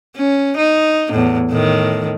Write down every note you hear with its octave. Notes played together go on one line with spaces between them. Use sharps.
C#4
D#4
E2 A2
A2 D#3